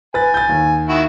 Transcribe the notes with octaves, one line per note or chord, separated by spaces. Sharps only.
B4 G#5 A6
G6 A6
D#2
D#3 E4 F#4